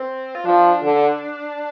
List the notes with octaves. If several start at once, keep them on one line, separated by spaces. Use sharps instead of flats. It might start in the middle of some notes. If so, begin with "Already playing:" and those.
Already playing: C4
F4
F3 D4
D3